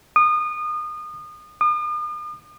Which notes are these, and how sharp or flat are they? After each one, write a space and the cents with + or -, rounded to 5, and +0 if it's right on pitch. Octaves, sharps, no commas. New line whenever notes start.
D#6 -30
D#6 -45